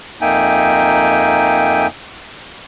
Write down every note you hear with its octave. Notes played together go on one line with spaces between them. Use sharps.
F2 A#3 D#4 E5 G5 G#5